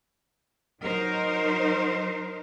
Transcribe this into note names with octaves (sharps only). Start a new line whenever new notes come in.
F#3 D#4 A#4 C5